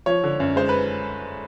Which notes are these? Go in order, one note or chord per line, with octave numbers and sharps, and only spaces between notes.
F3 C#5
D3
F#2
G#3 C5
B4